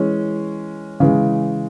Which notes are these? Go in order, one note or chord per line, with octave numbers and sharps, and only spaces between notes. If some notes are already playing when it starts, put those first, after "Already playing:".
Already playing: E3 G#3 C#4
C#3 E3 G#3